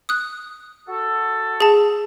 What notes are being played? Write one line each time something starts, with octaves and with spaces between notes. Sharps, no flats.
D#6 F#6
F#4 A4
G#4 A5